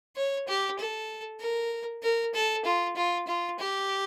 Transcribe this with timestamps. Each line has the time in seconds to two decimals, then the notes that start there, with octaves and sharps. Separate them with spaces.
0.16 C#5
0.48 G4
0.79 A4
1.40 A#4
2.03 A#4
2.34 A4
2.65 F4
2.96 F4
3.27 F4
3.59 G4